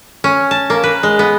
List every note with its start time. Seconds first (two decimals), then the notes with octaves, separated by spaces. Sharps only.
0.24 C#4
0.51 A5
0.70 A#3
0.84 B4
1.03 G#3
1.19 B3